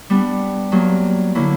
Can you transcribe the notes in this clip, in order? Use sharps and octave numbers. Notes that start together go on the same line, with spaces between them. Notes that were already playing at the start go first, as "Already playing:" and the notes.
G3 B3 D4
G2 F#3 A#3
D3 F#3 A#3 E4